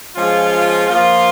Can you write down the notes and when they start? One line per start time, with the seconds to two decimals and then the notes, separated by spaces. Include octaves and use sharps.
0.16 F3 G#3 C#4 F4
0.87 F3 A#3 F4